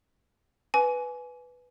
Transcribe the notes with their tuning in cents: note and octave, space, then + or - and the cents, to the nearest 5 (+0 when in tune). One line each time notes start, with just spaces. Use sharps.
B4 +0 G#5 +25 D6 -30